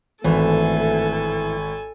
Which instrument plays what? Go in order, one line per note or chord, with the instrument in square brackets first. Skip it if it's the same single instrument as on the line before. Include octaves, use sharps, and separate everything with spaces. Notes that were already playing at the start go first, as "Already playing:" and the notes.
[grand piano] G#1 [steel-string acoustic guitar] A2 E3 [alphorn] A3 [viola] A4 G#5